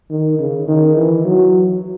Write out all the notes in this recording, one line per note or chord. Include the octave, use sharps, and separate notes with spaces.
D#3
C#3
D#3
E3
F#3